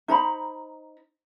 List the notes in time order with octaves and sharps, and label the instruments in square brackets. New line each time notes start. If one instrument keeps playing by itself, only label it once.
[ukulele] D#4 C5 A#5 B5